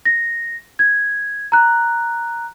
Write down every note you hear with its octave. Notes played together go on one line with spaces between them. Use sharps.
A#6
G#6
A#5 F#6